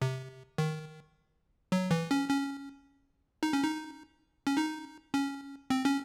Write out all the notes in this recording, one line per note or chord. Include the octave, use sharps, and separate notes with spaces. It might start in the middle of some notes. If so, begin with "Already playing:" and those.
C3
D#3
F#3
E3
C#4
C#4
D#4
C#4
D#4
C#4
D#4
C#4
C4
C#4